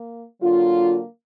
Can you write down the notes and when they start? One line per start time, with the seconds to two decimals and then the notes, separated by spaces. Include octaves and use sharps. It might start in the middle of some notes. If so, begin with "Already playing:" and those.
Already playing: A#3
0.41 D3 F#3 A#3 F4